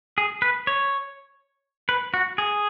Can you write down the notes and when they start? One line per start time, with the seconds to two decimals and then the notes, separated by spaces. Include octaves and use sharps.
0.18 G#4
0.42 B4
0.67 C#5
1.89 B4
2.14 F#4
2.38 G#4